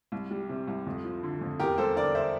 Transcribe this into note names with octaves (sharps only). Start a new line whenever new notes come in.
C2
G3
C3
C2
F2
F3
D3
F2
E2 G4 A#4
G3 A4 C5
D3 A#4 D5
C5 E5